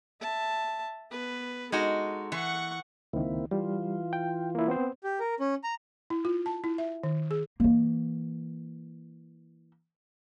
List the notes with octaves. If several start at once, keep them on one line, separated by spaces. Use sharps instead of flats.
E5 A5
B3 B4
G#3 D#4 F#4 A4
E3 F#5 C#6
C#2 D#3 A#3 C4 E4
E3 G3 F4
G5
A#3 E4
B3 C4 C5
G4
A#4
C#4
A#5
E4
F4
A5
E4
E5
D#3
G#4
E3 A#3